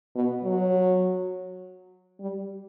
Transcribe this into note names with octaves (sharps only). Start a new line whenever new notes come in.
B2
F#3
G3